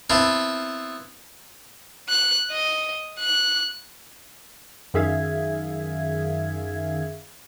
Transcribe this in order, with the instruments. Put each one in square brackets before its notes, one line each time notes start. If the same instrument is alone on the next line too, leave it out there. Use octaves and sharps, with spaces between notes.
[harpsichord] B3 C4 E4 F5 A5
[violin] F#6
D#5
F#6
[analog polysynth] F#2 D#3 G#4 E5 F5 G#6